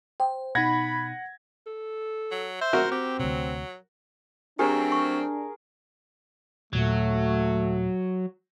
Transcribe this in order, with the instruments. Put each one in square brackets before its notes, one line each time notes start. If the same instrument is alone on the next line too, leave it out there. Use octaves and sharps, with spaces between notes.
[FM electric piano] C5 [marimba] G5
[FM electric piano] B2 D#4 [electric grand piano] F#5 G#6 A#6 [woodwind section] B5
[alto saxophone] A4
[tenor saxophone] F#3
[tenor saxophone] C5 [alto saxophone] E5
[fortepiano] F#4 A#4
[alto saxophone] C4 [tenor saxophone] G4
[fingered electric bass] D2 C3 [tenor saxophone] F#3
[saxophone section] F#3 A3 C4 [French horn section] D4 [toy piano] G4 C5 [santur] G#4 A#4
[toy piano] C#6
[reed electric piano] D#2 A#2 [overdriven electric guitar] F#3 [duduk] A3